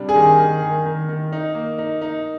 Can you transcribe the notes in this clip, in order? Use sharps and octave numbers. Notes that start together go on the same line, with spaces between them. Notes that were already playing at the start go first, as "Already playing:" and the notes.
Already playing: C3 G3 D4
G#4
D#3
D#3
D#3
D#3
D#3
D#4
A#3
D#4
D#4